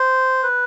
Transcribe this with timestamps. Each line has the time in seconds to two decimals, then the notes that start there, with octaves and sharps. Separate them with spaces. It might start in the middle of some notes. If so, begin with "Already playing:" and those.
Already playing: C5
0.43 B4